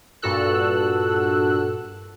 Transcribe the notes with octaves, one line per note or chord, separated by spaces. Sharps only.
G2 A#2 F#4 A4 E6 F#6